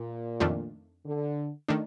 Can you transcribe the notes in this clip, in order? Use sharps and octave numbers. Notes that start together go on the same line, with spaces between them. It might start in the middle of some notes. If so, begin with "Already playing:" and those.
Already playing: A#2
F2 D#3 A3 D4 F4
D3
D#3 A3 D4